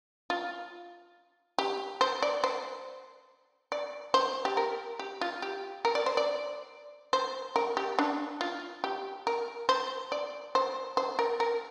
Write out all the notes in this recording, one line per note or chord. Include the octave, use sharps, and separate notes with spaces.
F4
G4
C5
D5
C5
D5
C5
G4
A#4
G4
F4
G4
A#4
D5
C5
D5
C5
A#4
G4
D4
F4
G4
A#4
C5
D5
C5
C5
A#4
A#4